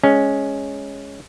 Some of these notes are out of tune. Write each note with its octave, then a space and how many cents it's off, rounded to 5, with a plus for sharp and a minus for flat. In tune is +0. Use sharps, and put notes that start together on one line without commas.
G#3 +0 C#4 +0